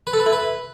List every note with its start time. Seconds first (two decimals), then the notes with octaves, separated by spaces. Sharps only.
0.07 B4
0.13 A4
0.20 B4
0.26 E4
0.33 B4